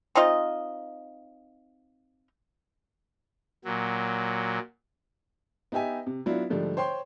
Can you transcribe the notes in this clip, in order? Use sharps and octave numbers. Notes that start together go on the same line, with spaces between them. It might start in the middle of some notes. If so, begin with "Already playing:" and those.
C4 D#4 F4 D#5
A#2 F#3
B3 D#4 G4 E5 G#5
C3
F#3 B3 D4 E4 F4
G#2 D3 F3 G3 A3
C5 C#5 G5 C6